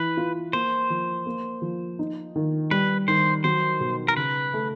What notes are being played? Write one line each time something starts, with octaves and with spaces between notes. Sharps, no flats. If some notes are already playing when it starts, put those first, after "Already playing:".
Already playing: E3 B4
F4
A#3 C5
F3
A#3
F3
D#4
D#3
G3 B4
D#3 C5
F#3 C5
B2
A#4
C#3 B4
A3